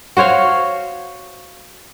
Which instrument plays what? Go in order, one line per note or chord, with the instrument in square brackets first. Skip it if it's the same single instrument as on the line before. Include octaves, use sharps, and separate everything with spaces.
[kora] F#4 C5 C#5 F5